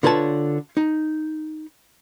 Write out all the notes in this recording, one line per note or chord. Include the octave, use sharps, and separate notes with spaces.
D3 F4 B4 C#5 A5
D#4